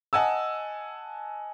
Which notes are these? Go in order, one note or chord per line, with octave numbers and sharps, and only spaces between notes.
D#5 F#5 G#5 A5 E6